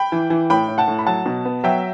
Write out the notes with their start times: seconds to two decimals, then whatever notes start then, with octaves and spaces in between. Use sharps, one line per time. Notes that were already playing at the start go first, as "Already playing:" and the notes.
Already playing: G5 B5
0.12 E3
0.30 E3
0.50 A2 G5 B5
0.68 A2
0.78 F#5 A5
0.88 A2
0.99 B5
1.06 F#3 F#5 A5
1.26 B2
1.45 B3
1.64 F#3 E5 G5